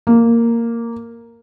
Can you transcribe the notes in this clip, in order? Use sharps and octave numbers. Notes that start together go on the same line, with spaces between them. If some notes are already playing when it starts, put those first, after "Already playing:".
A#3